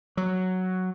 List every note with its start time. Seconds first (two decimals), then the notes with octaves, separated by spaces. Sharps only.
0.17 F#3